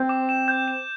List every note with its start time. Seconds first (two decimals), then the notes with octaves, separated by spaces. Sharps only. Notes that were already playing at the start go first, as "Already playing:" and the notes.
Already playing: C4 G6
0.09 D6
0.29 E7
0.48 G6
0.68 E7